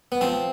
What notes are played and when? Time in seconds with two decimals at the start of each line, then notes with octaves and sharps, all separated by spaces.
0.12 B3
0.21 F3 C4